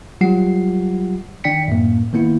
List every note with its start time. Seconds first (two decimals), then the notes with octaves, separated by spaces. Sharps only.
0.21 F#3 G3 F4 G4 F#5 C7
1.44 D#3 D4 D5 G5 B6 C#7
1.68 F#2 A2 A#3
2.13 D#3 A#3 B3 E4